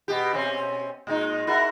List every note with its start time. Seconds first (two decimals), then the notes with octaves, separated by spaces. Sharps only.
0.08 B2 G4
0.33 B2 C4 C#4
1.07 A#2 G#3 D#4
1.47 E4 F#4 A#4